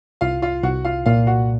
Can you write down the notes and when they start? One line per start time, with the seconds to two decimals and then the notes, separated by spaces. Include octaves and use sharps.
0.21 C2 F4 F5
0.42 F4 F5
0.63 C2 F#4 F#5
0.85 F4 F5
1.06 A#2 F4 F5
1.27 F#4 F#5